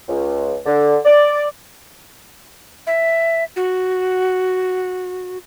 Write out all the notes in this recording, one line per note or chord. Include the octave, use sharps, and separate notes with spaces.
C#2
D3
D5
E5
F#4